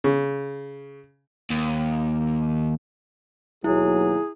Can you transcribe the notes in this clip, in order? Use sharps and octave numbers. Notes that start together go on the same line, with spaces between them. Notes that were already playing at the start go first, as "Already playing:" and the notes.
C#3
D#2
D#2 B2 F#3 E4 G#4